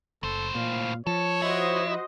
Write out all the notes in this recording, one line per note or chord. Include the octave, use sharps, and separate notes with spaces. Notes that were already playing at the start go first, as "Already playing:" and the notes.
F#1 A2 A4 C5
A#2 F5
F3 A4 C#5
E4 F#4 C5 D#5